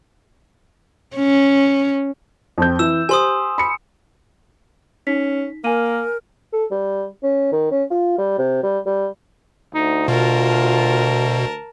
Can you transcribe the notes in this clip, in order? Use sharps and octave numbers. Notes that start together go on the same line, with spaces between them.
C#4
F2 C4 G6
E3 E6 E7
G4 C5 G#5 C6 D#6
B5 C#7
C#4 D#4 B6
A#3 A#4 G#5 D#7
A4
G3
C#4
D#3
C#4
F4
G3
C3
G3
G3
D2 D#4
B2 F4 A#4 A5